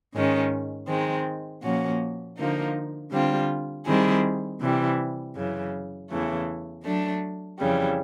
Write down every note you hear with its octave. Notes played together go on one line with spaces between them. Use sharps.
G#2 D#3 G#3 C#4
D#3 G#3 C4
A#2 F3 A#3 C#4 F#4
D3 F3 A#3 D#4
D3 G3 C4 F4
D#3 G3 C4 E4 G#4
C3 E3 G3
F#2 C#3 E3
E2 C#3 E3 A3
F#3 A3 D4
F2 C#3 E3 G3